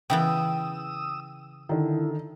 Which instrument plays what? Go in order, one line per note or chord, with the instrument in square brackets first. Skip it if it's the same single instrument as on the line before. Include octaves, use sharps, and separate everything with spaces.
[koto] C#3 E3 B3 [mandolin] G5 [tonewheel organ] D#6 E6
[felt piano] D3 D#3 [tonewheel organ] E4